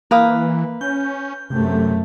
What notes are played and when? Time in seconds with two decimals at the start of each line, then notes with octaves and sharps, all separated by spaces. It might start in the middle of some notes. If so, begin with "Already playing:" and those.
0.11 E3 A#3 B4 F5 D#6
0.81 C#4 G6
1.50 F#2 C3 A3